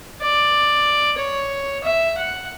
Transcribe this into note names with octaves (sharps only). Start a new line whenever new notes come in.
D5
C#5
E5
F#5